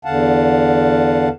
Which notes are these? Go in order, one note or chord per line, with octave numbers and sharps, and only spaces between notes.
E2 D3 F5 F#5 A5